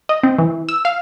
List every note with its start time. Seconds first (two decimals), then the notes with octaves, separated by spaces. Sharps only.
0.09 D#5
0.23 C4
0.38 E3
0.69 E6
0.85 F5